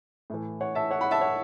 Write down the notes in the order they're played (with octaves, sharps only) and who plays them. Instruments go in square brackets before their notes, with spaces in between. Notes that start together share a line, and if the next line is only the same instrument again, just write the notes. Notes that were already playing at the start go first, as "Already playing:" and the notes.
[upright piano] A2 E3
C#5 F#5
E5 A5
C#5 F#5
F#5 B5
E5 A5
C#5 F#5